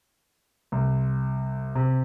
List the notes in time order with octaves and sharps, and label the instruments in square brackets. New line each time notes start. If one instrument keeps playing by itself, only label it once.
[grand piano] C2
C3